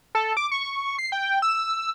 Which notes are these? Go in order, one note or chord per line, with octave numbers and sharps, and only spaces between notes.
A4
D6
C#6
C7
G5
E6